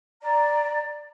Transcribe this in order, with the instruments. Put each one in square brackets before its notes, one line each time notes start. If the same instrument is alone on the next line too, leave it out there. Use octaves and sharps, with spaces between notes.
[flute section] D5 A#5